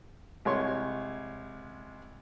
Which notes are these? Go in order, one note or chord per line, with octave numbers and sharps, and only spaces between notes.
C2 G#3 C#5 C6 C#6